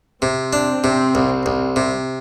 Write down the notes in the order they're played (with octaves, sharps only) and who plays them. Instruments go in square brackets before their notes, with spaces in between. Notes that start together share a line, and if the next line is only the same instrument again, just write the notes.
[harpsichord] C3 [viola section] C4
[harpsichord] D4
C3
C2
C2
C3